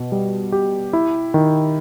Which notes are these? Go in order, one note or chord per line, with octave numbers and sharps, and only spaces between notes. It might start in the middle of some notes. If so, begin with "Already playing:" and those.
Already playing: B2
G3
G4
E4
D#3